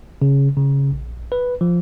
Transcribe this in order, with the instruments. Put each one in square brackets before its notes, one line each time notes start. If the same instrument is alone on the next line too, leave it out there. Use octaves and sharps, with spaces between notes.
[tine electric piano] C#3
C#3
A#1
B4
F3